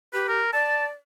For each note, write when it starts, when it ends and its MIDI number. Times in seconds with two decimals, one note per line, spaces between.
0.13 0.39 67
0.13 0.25 71
0.28 0.52 70
0.53 0.87 74
0.53 0.85 81